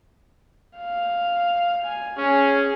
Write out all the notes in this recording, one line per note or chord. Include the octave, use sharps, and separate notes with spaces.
F5
G#5
C#4 G#4